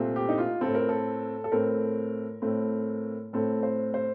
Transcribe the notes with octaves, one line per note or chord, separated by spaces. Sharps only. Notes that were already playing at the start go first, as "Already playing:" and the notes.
Already playing: C2 A#2 A3 C4
G4
D#4
F4
A2 A3 C4 A4
A#4
A4
A4
A2 A3 C4 A#4
A2 A3 C4
A2 A3 C4 A4
C5
C5